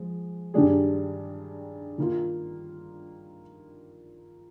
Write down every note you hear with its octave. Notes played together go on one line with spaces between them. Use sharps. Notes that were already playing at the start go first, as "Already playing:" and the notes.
Already playing: F3 G#3
G2 D#3 G3 D4 G#4
D#3 A#3 F4